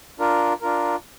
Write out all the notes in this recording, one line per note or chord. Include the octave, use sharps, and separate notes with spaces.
D4 F4 A#4
D4 F4 A#4